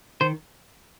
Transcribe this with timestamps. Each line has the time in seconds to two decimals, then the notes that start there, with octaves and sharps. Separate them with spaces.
0.21 D#3 C5